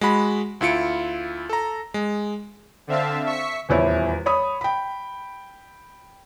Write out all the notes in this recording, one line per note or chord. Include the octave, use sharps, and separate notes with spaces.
G#3 F#4 B5
D2 E4 F4 C#7 D7
A4 A#5
G#3
D3 C4 E5 F5 A5
E5 C#6 B6 C#7
D#1 E2 E4 C#5
C#5 B5 D#6
G5 B5